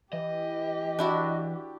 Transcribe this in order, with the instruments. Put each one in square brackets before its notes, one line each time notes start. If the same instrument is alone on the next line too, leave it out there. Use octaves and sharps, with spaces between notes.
[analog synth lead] E3 [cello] G4 [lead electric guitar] D#5
[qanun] D4 E4 F#4